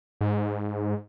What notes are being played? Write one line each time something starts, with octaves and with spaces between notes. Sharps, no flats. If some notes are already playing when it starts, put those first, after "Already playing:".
G#2